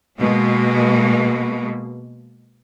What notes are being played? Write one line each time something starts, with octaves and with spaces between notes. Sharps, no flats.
B2 G#3 A#3